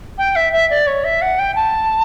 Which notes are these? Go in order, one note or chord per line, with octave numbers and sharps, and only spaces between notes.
G5
E5
E5
D5
C#5
E5
F#5
G5
A5